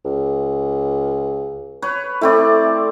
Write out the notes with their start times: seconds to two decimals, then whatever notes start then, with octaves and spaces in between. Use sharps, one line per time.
0.05 C#2
1.82 B4 C#5
2.21 A3 C4 E4 D5